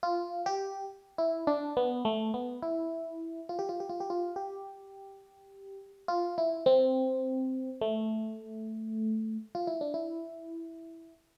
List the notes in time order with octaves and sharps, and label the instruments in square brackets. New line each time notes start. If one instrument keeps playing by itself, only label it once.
[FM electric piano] F4
G4
E4
D4
B3
A3
B3
E4
F4
G4
F4
G4
F4
G4
F4
G4
F4
E4
C4
A3
F4
E4
D4
E4